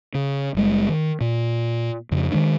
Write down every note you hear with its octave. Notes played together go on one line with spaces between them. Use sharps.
C#3
F#1 G3 G#3
D#3
A#2
F2 C#3
D#3 E3 G#3 D4